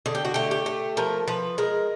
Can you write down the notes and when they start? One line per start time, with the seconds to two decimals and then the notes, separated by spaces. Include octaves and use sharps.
0.06 D3 G#4
0.15 G4
0.25 F#4
0.34 A3 G4
0.51 G4
0.66 A3
0.97 F3 A#4
1.28 F3 B4
1.58 G#3 A#4